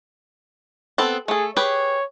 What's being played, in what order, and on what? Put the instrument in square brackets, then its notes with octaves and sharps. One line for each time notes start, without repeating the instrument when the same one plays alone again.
[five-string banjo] B3 C4 A4
[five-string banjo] A3 A4 [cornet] G#4
[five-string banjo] G4 G#4 B4 [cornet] C#5